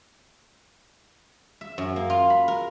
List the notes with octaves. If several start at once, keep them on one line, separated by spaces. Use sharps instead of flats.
E5
F#2
A#3
F4
B5
A#4